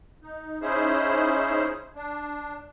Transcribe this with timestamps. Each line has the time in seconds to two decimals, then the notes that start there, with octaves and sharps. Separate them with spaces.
0.23 D#4
0.61 C#4 D#4 E4 G#4 C5
1.95 D4